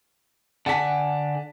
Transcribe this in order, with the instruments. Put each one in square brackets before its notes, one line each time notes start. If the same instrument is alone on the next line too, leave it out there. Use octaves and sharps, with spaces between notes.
[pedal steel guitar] D3 F#5 G#5 [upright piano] A5 B6